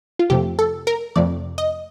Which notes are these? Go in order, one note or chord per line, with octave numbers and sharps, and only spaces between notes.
F4
F2 C3 F3 A3 G4
A4
A#4
F2 C3 F3 A3 D5
D#5